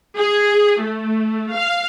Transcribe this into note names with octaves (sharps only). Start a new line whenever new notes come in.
G#4
A3
F5